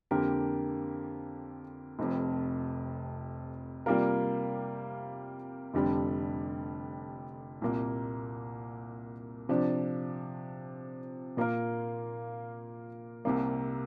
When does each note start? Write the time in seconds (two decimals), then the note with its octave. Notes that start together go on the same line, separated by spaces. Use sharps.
0.11 F2 D3 A#3 G4 A#4
1.99 F1 F2 C3
3.86 C3 G3 A#3 F4 A#4
5.74 F1 F2 D3 G3 D4
7.61 C2 A#2 A#3
9.49 C3 F3 D4
11.37 A#2 A#3 F4 A#4
13.25 C2 C3 A#3